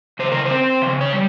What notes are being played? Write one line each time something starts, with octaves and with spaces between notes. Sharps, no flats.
C#3 C5
A#4
C5
C4
C#3
C#5
G3